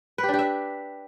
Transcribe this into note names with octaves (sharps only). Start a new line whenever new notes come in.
B4
G4
D4
G4
E5